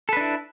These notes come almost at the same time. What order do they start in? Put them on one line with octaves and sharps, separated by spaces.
A4 B4 D4 E4